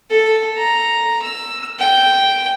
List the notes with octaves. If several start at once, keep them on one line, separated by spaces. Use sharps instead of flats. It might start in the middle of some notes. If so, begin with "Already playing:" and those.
A4
A#5
E6
G5